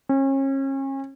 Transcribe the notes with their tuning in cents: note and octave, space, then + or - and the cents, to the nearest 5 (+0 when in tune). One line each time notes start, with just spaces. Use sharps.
C#4 -35